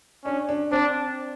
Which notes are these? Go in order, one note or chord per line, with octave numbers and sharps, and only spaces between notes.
C#4 D4
D4
C4 D4